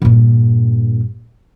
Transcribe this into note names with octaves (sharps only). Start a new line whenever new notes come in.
G2 A#2